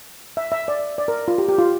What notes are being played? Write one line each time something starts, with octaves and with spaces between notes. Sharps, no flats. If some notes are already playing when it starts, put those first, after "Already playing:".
E5
E5
D5
D5
A#4
F4
G4
G4
F4